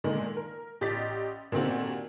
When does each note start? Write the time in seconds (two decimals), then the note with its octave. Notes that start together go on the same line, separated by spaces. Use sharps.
0.04 A#2 D3 D#3 G#3
0.36 A#4
0.81 A1 G4 D5 D#5 A6 B6
1.52 A#2 D3 D#3 C4 F#4 G4